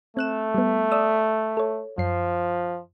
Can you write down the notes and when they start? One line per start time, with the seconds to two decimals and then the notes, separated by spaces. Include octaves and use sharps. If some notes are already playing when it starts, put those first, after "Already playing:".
0.17 A3 C4 F#6 E7
0.54 G3 B3
0.92 D5 D#6 E6
1.57 A4 C#5
1.98 F#2 F3 C7